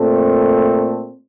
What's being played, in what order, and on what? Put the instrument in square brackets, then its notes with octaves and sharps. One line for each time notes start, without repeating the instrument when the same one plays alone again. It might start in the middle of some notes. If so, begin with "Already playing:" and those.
Already playing: [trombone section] A#2 A3 C4 A4